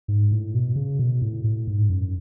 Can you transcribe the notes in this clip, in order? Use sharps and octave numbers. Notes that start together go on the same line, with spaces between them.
G#2
A2
B2
C#3
B2
A2
A2
G#2
F#2